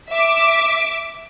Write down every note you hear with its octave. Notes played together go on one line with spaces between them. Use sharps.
E5 D6